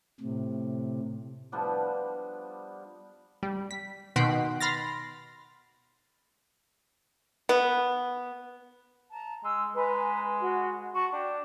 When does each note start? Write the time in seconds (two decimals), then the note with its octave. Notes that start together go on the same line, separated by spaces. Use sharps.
0.20 A2 C3
1.52 F3 G3 B3 D4
3.43 G3
3.71 B6
4.16 B2 D#3 F#5 C6 B6 D7
4.61 B5 C6 F6 A6 A#6
7.49 B3
9.12 A5 A#5
9.44 G#3 E6
9.76 G#3 B4 G#5 A#5
10.40 F#4
10.94 F#4 A5 C#6
11.12 D4 G5